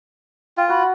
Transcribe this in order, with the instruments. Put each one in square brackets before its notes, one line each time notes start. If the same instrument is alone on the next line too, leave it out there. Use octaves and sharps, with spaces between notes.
[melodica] F4 [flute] G5
[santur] F#4 [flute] B5